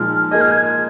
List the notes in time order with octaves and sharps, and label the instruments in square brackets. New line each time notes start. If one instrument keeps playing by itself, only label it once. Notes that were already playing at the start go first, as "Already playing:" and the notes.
Already playing: [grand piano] A#2 F3 G#3 D#4 [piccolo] F6
[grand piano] A#3 F4 G#4 D#5 [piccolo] G#6
[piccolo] F6
G#6